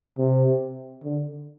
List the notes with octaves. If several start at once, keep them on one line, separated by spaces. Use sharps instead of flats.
C3
D3